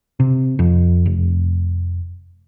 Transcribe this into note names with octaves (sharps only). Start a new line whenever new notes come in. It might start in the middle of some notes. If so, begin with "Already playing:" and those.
C3
F2
F1